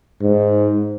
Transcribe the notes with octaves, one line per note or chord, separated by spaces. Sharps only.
G#2